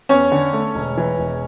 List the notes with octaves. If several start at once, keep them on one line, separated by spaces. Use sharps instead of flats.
E2 C#4 C#5
D3
A3
E1
E3
E1